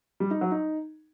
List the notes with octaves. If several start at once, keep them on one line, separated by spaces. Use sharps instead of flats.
G3
D#4
F#3
D#4